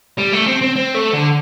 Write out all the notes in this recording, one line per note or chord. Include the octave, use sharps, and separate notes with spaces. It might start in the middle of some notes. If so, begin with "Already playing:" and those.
G3
A3
C4
C4
C4
A3
D3